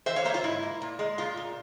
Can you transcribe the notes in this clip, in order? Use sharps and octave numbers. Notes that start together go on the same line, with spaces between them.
E3 C5 E5
C#5 F5
A#3 C5 E5
F4
G#2 E4
A#3
A#2
G#3
A#2 F4
A#2